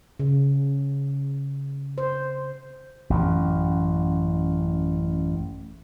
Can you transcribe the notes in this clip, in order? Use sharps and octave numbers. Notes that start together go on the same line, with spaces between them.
C#3
C5
A1 F#2